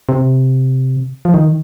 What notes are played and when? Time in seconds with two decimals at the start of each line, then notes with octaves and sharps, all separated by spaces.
0.09 C3
1.25 F3
1.34 D#3